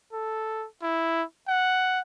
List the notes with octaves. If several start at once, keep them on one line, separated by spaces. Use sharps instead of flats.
A4
E4
F#5